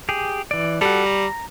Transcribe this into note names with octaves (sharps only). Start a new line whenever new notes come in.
G4 G#4
E3 D5
G3 F#4 A4
A#5